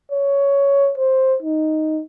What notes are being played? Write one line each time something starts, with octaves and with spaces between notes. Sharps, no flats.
C#5
C5
D#4